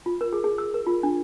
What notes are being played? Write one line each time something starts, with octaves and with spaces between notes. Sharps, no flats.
F4
A#4
G#4
G#4
E6
A#4
F4
D4